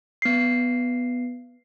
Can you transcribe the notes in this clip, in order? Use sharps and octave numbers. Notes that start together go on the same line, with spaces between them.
B3 C7